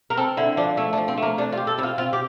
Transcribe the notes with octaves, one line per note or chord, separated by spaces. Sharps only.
A#4
C4 A4
D3 E4
F3 D4
A3 E4
D4
F3
C4
A3 A#3
C3 D4
F4
G4
A4
C3 E4
F4
C4 F4
G4